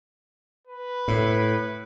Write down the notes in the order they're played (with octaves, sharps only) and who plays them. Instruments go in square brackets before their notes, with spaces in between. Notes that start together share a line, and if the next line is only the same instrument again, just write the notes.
[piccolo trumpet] B4
[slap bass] A2